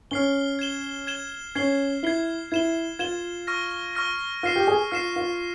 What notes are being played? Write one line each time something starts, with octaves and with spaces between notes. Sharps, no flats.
C#4 F6 C7 G7
G#6 E7 G7
G#6 E7 G7
C#4 G#6 C7 G7
E4 G#6 C7 G7
E4 G#6 E7 G7
F4 G#6 E7 G7
C#6 F6 A#6
C#6 F6 A#6
F4 F6 C7 E7
G4
G#4
F4 F6 C7 E7
F4